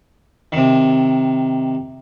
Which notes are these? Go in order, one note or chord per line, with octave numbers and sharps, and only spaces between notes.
C3 D#3